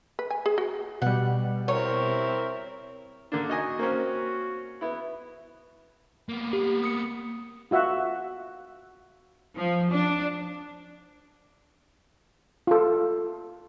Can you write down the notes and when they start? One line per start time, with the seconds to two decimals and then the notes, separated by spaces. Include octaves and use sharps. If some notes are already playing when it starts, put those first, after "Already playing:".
0.19 B4
0.30 G#5
0.46 G#4
0.58 F#4
1.02 B2 G3 F#5
1.68 C4 E4 A#4 C#5
3.32 D3 A#3 D4
3.49 D#4 F#4 D#5 G#5
3.79 A#3 C4 C#4
4.81 B3 E4
6.29 A#3 B3
6.53 G4
6.84 D#6 C#7
7.71 F4 F#4 E5 F#5
9.56 F3
9.91 D4
12.67 F4 A4